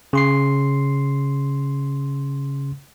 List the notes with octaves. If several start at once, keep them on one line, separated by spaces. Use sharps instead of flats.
C#3 C6 C7